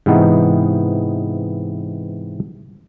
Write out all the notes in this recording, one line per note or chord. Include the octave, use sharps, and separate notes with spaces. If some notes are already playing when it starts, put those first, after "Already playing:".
G#2 C3 E3 B3 D#4